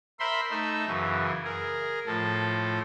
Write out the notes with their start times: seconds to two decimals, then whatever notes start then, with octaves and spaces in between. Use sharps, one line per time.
0.20 A#4 C5 E5 B5 C6
0.50 A3 D#4 E5
0.87 F#2 C#3 E3
1.44 G#4 A#4
2.07 A2 F3 A4